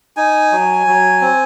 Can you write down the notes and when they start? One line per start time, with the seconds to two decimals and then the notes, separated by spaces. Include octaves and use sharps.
0.17 D#4 G#5
0.52 F#3
0.87 F#3
1.21 C4